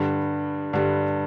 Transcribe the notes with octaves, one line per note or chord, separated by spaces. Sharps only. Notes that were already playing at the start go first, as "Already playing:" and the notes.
Already playing: G2 D3 G3
G2 D3 G3